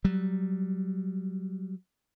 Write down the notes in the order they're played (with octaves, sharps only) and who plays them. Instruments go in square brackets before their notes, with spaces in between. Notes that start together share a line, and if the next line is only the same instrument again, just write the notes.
[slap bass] F#3 G3